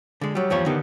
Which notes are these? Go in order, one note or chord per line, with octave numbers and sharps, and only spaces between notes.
D3 G#3
F#3 G3
E2 G2 F3 G3 C#5
D3 D#3 B3 D#4 G4